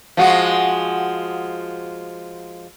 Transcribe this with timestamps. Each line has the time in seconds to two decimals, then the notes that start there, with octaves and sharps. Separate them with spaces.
0.17 F3 G#3 F#4 F5 F#5